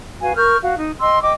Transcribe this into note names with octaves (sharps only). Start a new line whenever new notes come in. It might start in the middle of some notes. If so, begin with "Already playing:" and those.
F#4 B4 F5 G#5
A#4 C#6 F6 G6
F#4 F5
D#4
D#5 G5 C6 E6
D#5 G5 D6